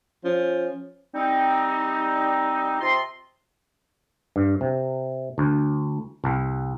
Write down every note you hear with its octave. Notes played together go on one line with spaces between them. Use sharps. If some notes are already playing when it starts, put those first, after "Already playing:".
F3 C#4
G3 C4 D#4
C3 C4 F4 D#5 C6
G2
C3
D2
C2